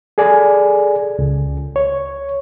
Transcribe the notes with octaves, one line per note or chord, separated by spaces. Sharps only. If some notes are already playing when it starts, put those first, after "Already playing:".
G#4 A4 D5 G#5
C#2
C#5